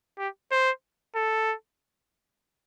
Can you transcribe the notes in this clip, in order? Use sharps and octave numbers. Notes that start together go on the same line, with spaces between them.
G4
C5
A4